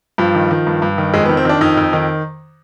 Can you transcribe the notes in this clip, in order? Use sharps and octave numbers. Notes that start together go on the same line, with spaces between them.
G2 F3
D#3
D#3
G2
G2
D#3
F2 G#3
B3
D#3
C4
D#3 D4
F2 D#4
F2
D#3